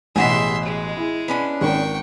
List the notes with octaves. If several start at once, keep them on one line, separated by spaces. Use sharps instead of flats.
A1 B2 G4 G#4 E5 F#5 C6
G#3
E4
B3 C#4 D4
G#1 A#4 G5 C#6